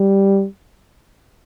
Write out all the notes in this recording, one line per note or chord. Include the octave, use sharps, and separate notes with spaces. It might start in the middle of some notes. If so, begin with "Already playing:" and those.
Already playing: G3